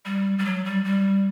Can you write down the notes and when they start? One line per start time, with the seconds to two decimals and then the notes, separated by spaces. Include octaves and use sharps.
0.05 G3
0.38 G3
0.45 F#3
0.65 G3
0.84 G3